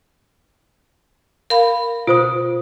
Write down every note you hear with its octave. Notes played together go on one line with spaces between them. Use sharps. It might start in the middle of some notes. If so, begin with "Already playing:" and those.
A#4 F5 B5
B2 F4 C5 D#6